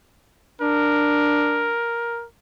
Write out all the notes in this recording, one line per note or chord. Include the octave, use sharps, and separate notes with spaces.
D4 A#4